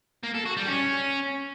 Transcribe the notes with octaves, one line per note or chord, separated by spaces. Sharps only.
A#3
A4
F#4
G3
C#4